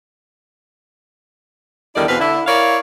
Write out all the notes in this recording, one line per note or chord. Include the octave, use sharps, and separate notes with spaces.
E2 D3 D#3 G3 E4 D5
E2 B2 C4 B4 F5
D3 E4
E4 A#4 C#5 D5 F5